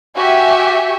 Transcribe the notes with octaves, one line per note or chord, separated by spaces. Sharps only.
F#4 G4 E5 G#5 C#6